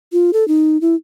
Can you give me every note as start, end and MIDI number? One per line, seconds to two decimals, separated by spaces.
0.12 0.31 65
0.33 0.47 69
0.48 0.80 63
0.81 0.95 64